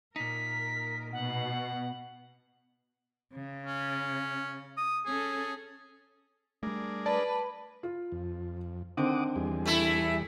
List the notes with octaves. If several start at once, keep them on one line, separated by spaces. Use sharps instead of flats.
A#2 D#4 A#4 B6
B2 F#5
C#3
C#4
D#6
C#4 G#4 A4
G3 A3 D4 G#4 A#4
B4 D5 A5
F4
F2
D3 D#3 C4 F#5 D6 D#6
E2 G3 G#4
A3 E4